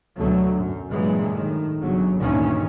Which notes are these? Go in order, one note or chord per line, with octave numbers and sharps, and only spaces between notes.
D2 B2 D3 F#3 A3
F#2
G2 A#2 E3 F#3 G#3
A2 D#3
G1 C#3 F#3
D2 G2 A#2 D#3 E3 C#4